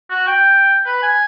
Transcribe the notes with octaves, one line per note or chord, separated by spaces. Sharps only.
F#4
G5
B4
G#5